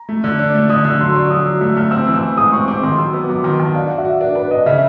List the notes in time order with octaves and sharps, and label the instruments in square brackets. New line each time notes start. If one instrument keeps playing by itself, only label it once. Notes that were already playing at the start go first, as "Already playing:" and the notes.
Already playing: [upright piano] A#5
[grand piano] A3
D3
D4
A3
[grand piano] D3 [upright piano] D#6
[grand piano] D3 [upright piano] E6
[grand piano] F#3 [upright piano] C6
[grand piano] D4 [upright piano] C#6
[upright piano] E6
[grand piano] F#3 [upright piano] D#6
[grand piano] F#3 [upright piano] D#6
[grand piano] A3 [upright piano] E6
[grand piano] A3 [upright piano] F6
[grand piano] C4 [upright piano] E6
[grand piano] E3
[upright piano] E6
[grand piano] E3
[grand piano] G#3 [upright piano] D#6
[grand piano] C4 [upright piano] C#6
[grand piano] C4 [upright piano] D6
[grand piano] D#3 [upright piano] C6
[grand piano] F#3 [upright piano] E6
[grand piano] B3 [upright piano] D6
[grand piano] F#3 [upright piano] D6
[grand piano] D#3 [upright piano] C6
[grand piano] D#3 [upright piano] A5
[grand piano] D4 [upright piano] F5
[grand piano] F#4
[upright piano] E5
[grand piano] F#4
[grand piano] D4 [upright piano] A#4
[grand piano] D4 [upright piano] B4
[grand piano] D4 [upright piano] D#5
[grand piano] C#3 [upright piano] E5